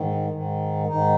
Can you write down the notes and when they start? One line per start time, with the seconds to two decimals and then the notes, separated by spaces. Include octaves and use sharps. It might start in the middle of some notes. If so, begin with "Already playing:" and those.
Already playing: G#2 D#3
0.30 G#2 D#3
0.86 G#2 D#3 D#4